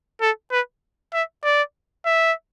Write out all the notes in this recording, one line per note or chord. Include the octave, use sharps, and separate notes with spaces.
A4
B4
E5
D5
E5